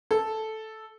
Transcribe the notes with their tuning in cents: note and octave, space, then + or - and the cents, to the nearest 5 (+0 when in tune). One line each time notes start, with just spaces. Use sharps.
A4 -5